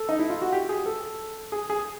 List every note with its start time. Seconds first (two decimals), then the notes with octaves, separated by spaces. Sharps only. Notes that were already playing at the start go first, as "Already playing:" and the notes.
Already playing: A4
0.09 D#4
0.19 E4
0.30 F4
0.42 F#4
0.52 G4
0.69 G#4
0.86 A4
1.52 G#4
1.70 G#4